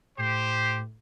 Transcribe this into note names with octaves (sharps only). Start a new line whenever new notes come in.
A2 G4 C5